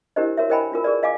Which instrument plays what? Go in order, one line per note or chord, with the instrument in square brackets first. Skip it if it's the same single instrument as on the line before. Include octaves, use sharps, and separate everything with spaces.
[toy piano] D4 E4 G4 A#4 C5 D#5
F#4 A#4 C#5 E5
A#4 C5 D#5 G5 G#5 B5
D4 F4 A#4
G#4 A#4 B4 D5
D#5 F5 G#5 D6